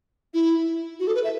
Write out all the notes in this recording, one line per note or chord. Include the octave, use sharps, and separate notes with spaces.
E4
F#4
A4
B4
E5